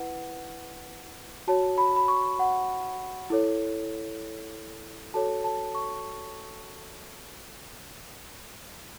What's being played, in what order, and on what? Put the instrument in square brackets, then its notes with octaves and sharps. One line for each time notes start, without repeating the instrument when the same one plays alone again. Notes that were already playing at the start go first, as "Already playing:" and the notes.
Already playing: [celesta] E4 B4 F#5
F#4 C#5 A5
B5
B5
C#6
F#5
E4 A4 C#5
F#4 A4 C#5 A5
A5
C#6